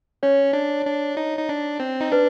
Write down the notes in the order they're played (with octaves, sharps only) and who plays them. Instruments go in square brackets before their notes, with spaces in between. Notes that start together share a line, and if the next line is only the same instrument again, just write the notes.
[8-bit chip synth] C#4 [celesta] C#5
[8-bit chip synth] D4
D4
D#4
D#4
D4
C4
D#4
[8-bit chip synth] D4 [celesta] B4